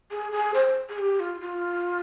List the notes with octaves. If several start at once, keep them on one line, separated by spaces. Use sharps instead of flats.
G#4
G#4
C5
G#4
G4
F4
F4